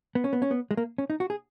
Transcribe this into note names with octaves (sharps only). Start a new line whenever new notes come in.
B3
C#4
B3
C#4
B3
G#3
A#3
C#4
D#4
F#4
G#4